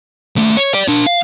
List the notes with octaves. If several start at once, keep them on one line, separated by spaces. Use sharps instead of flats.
D#2 A3
C#5
D5 G5
D4 A#4
F5